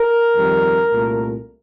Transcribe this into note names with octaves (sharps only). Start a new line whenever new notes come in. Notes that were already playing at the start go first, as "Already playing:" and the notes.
Already playing: A#4
F2 D#3 G3
C2 A#2 A3